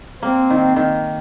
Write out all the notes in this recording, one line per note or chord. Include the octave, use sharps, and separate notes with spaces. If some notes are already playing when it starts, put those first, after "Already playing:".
A#3 C4
D#3
D#3